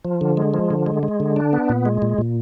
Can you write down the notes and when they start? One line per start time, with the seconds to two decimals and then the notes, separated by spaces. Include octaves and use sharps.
0.05 F3
0.21 D3
0.37 G#3
0.54 F3
0.70 D3
0.86 G#3
1.03 G#3
1.20 D3
1.36 D4
1.53 B3
1.69 A#2
1.86 G#3
2.02 A#2
2.18 A#2